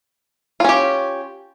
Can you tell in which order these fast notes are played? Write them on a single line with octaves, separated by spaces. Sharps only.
F4 C#4 G4